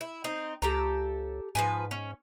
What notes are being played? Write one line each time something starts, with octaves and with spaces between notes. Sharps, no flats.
E4
C4 D#4
C#2 G4 A4 A#5
G#2 F3 B4 G#5
C#4